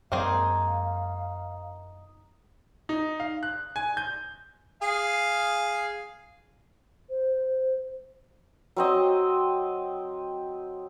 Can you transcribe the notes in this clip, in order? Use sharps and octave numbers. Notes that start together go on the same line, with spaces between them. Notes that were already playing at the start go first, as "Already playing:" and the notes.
F#2 F#3 G#3 A#3 C4 D#4 G#4 F5
D#4
F5
F#6
G#5
G6
G#4 F5
C5
F#3 C4 D#5